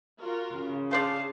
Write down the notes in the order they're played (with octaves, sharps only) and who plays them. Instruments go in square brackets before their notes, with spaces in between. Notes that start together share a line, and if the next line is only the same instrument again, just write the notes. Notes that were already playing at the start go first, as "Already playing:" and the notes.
[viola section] F4 F#4 A#4
[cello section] C#3
[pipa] A3 C5 D5 [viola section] D4 G#4 A5 [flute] F5